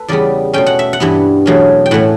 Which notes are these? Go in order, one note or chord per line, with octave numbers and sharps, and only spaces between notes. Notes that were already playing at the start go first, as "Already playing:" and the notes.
Already playing: A4 B4
E2 C#3 G3 B3 D5
B2 A3 C#4 G5
F#5
E5
F#5
G2 E3 G3 B3
E2 B2 F#3 A3 C#4
G5
A2 E3 A3 C#4 F#5